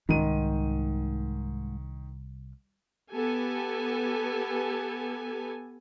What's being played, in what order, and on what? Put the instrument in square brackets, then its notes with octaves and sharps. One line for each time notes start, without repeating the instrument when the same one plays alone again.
[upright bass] C2 [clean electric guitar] G#2 [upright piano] D#3 D#7
[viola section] B3 G4 A4 G#5